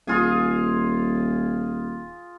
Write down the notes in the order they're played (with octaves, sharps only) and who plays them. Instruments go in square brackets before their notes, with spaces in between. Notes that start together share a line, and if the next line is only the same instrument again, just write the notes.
[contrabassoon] D#1 [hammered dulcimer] F4 G#4 G#5